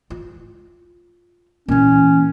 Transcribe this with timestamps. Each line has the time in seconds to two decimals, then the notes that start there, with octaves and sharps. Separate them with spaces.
0.10 F4
1.68 A#2 E3 C#4